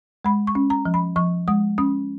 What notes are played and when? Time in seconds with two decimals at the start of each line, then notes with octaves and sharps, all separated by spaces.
0.25 G#3 B5
0.47 C#6
0.55 C#4
0.70 A#5
0.85 F3
0.94 B5
1.16 F3 C#6
1.48 G#3 D#6
1.78 C#4 D#6